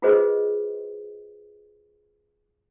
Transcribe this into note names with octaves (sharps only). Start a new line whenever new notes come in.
F4 F#4 G#4 B4 C5 D#5